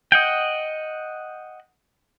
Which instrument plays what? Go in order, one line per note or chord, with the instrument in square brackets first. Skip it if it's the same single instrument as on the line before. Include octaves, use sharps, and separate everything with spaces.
[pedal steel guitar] D#5 F#5 G5